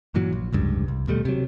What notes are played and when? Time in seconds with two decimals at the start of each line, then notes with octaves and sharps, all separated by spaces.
0.14 G2 A#2 E3 F#3
0.33 A#1
0.53 F1 C#2 G2
0.88 C2
1.07 D#2 B2 G3 A3
1.25 C3 F#3